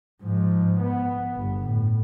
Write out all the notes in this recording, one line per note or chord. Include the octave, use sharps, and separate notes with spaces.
G#2 F3
B3
G1
A2